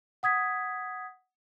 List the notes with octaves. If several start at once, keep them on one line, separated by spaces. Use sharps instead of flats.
F#5 D#6 G#6 B6